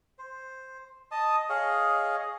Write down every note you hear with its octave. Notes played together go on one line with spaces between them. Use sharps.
C5
D#5 A5 D#6
G#4 C#5 D#5 F5